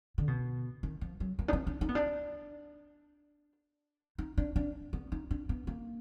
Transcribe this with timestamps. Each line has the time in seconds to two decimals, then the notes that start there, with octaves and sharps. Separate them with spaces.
0.18 D3
0.28 B2
0.83 D#3
1.01 F3
1.20 F#3
1.39 A#3
1.48 D4
1.53 B3
1.67 D4
1.81 D#4
1.89 B3
1.95 D4
4.18 D#4
4.38 D4
4.56 D4
4.93 B3
5.12 D#4
5.31 D4
5.49 B3
5.67 A#3